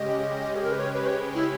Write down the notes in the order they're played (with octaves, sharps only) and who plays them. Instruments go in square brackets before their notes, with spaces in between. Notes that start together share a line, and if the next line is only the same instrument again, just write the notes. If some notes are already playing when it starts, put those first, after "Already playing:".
Already playing: [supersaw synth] C#3 G#3 C#4 G4 [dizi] D#5
[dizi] G#4
A#4
B4
C#5
B4
C#5
E4